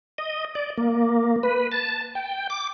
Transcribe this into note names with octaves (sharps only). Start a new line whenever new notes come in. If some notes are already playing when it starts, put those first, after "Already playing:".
D#5
D5
A#3
B4
A5
G5
D6